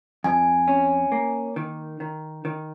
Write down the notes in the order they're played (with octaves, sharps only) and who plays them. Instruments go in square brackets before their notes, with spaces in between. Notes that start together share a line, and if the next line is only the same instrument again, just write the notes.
[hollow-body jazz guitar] F2 [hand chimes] G#5
[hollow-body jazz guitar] C#4
A#3
D#3
D#3
D#3